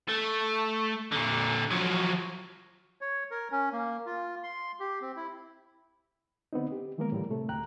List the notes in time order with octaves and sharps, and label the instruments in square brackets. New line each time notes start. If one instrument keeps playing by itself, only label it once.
[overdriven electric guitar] A3
A#2 D3
F3 F#3
[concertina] C#5
A#4
C#4
A#3
F4
C6
G4
C4
E4
[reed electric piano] D3 B3 C4 D#4
G4
D#3 E3 G#3 A#3 B3 A#4
A2 D3 G3
A2 C3 A3 A4
D2 G5 A#5 F#6